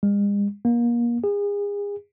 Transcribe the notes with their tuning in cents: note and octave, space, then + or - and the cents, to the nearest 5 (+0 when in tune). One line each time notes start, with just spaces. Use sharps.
G#3 -45
A#3 +30
G#4 -35